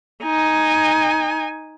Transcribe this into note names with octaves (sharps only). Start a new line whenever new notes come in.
D#4 G#5